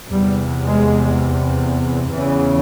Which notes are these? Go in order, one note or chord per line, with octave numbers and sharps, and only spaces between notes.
E2 C3 G3
G#3
E2 C#3 E3